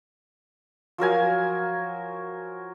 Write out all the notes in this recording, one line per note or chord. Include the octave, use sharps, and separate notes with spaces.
F3 F#3 A#4 G#5